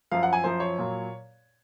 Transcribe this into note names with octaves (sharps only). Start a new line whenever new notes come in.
F#2 F3 F5
F#5
G#5
F#2 F3 C5
C#5
A#2 F#3